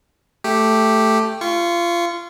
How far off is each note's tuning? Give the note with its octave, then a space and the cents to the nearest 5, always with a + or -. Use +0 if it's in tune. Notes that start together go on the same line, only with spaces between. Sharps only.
A3 +0 G4 +0
F4 -25 C#6 +0